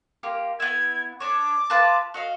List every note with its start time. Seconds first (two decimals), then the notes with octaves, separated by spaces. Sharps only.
0.23 A#3 F4 G4
0.60 B3 E4 G#6
1.20 D4 C#5 D6
1.70 F4 B4 A5
2.14 F#4 D#5 F5